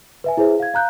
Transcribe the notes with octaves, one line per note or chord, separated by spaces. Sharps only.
B4 E5 G#5
E4 G#4 B4 C5 E5
F5 G#6
F5 A#5 F#6 G6